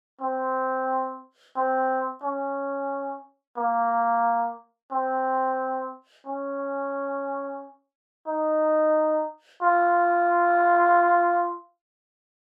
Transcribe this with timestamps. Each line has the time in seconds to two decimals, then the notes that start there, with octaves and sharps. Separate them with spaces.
0.21 C4
1.57 C4
2.24 C#4
3.58 A#3
4.92 C4
6.27 C#4
8.28 D#4
9.63 F4